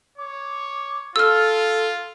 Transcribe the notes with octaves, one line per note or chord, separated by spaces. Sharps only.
C#5 D6
F4 A4 E6 F6